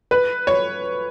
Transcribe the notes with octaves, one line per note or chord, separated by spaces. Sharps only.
B4
C#5